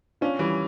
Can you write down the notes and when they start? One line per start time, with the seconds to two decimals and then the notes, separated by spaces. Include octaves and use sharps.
0.21 C#4 D4 F4
0.39 E3 G3